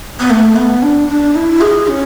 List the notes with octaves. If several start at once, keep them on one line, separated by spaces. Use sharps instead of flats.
B3
A3
B3
D4
D4
E4
G#4
C#4